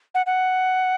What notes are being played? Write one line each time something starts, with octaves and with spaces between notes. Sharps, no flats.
F#5
F#5